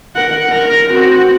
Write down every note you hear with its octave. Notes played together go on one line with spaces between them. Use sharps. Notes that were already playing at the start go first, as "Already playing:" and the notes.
A#4 F#5
A#4 A#5
C4 F#4